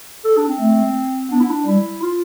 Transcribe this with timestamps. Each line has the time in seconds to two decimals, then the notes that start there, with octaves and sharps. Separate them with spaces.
0.24 A4
0.37 D4
0.48 C4
0.60 A3
1.31 B3 D4
1.40 E4
1.50 D4
1.66 G3 E4
2.02 F4